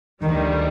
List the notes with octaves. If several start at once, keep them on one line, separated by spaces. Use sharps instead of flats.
D2 D3 D#3 G3